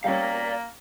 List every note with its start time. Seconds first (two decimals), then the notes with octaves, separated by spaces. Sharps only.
0.04 G3 A#3 C#4 D5 F5